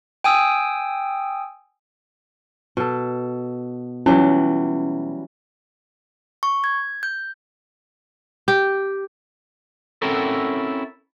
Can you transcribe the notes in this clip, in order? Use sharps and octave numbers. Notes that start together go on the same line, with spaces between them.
G5 G#5 D#6 E6
B2 A4
E3 F#3 G3 C#4
C#6
G#6
G6
G4
C4 C#4 E4 F#4 A4 A#4